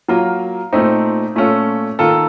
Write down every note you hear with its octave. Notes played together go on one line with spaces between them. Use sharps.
F#3 A#3 F4 A#4
A#2 A3 C4 D#4
A#2 A3 C#4 F4 A4
D#3 A#3 F4 A4